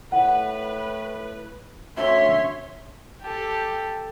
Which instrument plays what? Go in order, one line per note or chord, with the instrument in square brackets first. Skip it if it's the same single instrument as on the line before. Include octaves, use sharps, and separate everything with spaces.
[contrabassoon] A2 [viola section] B4 [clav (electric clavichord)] F#5
[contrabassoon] D2 [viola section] C#4 C#5 C6 [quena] E5
[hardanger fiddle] G4 A4